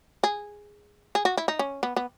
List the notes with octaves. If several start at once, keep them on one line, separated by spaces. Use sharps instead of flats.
G#4
G#4
F#4
E4
D#4
C#4
B3
B3